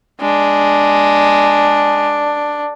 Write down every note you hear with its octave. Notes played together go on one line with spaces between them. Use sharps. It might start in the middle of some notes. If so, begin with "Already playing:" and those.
G#3 D4